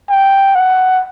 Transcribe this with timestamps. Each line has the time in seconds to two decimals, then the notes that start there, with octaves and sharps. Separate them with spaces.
0.10 G5
0.55 F#5